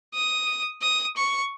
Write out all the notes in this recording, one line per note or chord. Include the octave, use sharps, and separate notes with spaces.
D#6
D#6
C#6